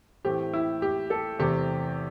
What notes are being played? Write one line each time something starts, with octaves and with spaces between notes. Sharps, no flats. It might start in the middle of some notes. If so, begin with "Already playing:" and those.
A2 E3 A3 C4 G4
E4
G4
A4
E2 C3 A3 G4